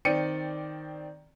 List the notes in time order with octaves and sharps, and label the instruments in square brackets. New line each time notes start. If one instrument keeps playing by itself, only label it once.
[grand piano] D#3 C4 D5 G5 C#7 D#7